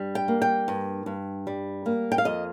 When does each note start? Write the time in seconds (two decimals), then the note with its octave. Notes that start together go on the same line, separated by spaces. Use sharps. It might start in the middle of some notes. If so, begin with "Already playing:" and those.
Already playing: G2 G3
0.15 G5
0.28 A#3
0.42 G5
0.68 G2
1.06 G2
1.47 G3
1.86 A#3
2.12 G5
2.18 F5
2.25 F2 D#5